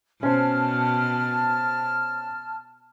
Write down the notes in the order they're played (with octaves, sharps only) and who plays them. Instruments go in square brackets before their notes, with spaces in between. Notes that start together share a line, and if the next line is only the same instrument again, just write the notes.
[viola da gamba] B2 [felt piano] C#4 C5 [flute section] A5 F6